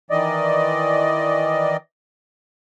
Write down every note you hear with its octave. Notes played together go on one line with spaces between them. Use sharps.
D#3 E3 D5 D#5